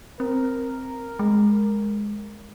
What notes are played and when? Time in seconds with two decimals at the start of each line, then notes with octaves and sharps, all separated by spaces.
0.20 C4 A#4
1.19 G#3